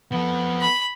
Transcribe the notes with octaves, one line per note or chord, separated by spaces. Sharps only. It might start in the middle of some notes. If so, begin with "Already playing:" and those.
F3 B3 A4
B5